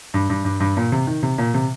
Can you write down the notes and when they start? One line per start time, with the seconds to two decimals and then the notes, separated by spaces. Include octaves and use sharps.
0.14 G2
0.30 G2
0.45 G2
0.60 G2
0.77 A#2
0.92 C3
1.07 D#3
1.23 C3
1.38 A#2
1.54 C3